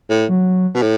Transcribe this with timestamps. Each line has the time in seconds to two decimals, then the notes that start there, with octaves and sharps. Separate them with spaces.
0.10 A2
0.28 F#3
0.75 B2
0.82 A2